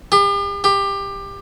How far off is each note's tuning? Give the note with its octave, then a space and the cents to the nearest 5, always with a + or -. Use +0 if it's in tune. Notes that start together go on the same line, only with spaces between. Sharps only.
G4 +40
G4 +20